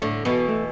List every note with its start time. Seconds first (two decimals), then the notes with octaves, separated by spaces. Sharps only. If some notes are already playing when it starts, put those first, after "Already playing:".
0.02 A2 D3 A3
0.25 B2 E3 B3
0.49 A3